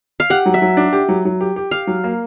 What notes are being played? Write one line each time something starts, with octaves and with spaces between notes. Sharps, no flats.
F5
G4 F#5
F#3
E5
F#3
D4
G4
F#3
F#3
G4
G4
G4 F5
F#3
A#3